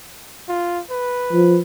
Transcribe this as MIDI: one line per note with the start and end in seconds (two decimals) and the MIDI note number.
0.49 0.81 65
0.91 1.61 71
1.33 1.59 53